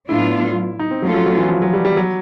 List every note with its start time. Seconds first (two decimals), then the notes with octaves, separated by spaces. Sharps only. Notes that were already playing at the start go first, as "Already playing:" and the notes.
0.08 A2 F#3 B3 D4 E4 F4
0.79 D#4
0.91 C4
1.02 F3 F#3 A3 C#4 F4 A4
1.14 F#3
1.26 F#3
1.37 E3
1.49 F3
1.62 F#3
1.73 G3
1.85 G3
1.97 F#3